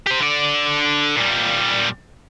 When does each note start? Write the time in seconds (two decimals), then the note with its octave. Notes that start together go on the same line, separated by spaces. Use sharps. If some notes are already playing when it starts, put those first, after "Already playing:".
0.07 G4 C5
0.20 D3 D5
1.16 A#2 G3